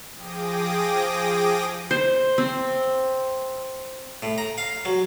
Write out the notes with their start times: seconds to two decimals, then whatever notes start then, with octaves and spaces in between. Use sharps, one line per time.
0.13 F3 G#4 G5 D6 D#6 A#6
1.91 C5
2.38 C4
4.22 A2
4.38 A#5
4.58 F5
4.85 F#3